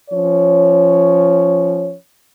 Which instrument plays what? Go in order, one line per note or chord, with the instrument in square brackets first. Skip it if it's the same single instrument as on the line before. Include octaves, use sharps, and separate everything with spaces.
[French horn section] F3 C#4 C#5